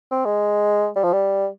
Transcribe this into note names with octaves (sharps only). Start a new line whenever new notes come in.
C4
G#3
G3
F3
G3